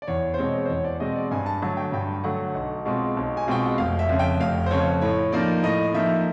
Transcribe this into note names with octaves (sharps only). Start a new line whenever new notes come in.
D5
E2 C#5
C5
B2 G#3 C4 C#5
C5
E2 C#5
D5
B2 G#3 C4 D#5
D5
G2 G#5
A5
D3 F#3 A3 A5
G5
G2 G5
D3 F#3 A3 F#5
B1
B2 G#3 C4 F4
B1
G#5
B2 G#3 C4 F4 G5
F#5
F1 F5
E5
F2 C#3
G5
F1 F5
C5
F2 C#3 C#5
A2 C#5
F3 A#3 D#4 D5
A2 D#5
F3 A#3 D#4 E5